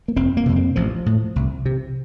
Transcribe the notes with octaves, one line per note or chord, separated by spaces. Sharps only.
A#3
F1 C4
A#3
F2 C3
C4
A1 F3
A2
C2
C3